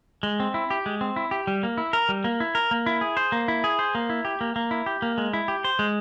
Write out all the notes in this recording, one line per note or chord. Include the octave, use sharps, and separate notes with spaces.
G#3
C4
E4
G4
G#3
C4
E4
G4
G3
A#3
E4
A#4
G3
A#3
E4
A#4
A#3
E4
G#4
C5
A#3
E4
G#4
C5
A#3
E4
G4
A#3
A#3
E4
G4
A#3
G#3
E4
G4
C5
G#3